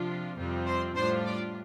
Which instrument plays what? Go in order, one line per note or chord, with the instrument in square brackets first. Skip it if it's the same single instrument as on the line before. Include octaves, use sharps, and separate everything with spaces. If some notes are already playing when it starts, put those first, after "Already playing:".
Already playing: [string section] C3 F3 D4 F4
F2 C3 G3 C4 F4
C5 C6
A2 G3 D4 F4 C5 C6
D5 D6